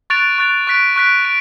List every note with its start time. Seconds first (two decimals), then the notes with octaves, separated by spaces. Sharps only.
0.10 C#6 F#6 A6 D7 F7
0.38 C#6 F#6 A6 D7 F7
0.67 C#6 F#6 B6 D7
0.96 C#6 F#6 B6 D7
1.25 D7